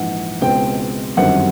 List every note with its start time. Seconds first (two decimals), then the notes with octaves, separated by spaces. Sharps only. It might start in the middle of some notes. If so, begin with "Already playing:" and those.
Already playing: A#1 G#2 E3 F#5
0.41 C#2 B2 G#3 C4 G5
1.17 G1 F#2 D#3 G3 C4 F#5